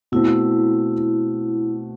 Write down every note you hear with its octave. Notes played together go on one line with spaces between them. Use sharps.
B2 A3 C4 E4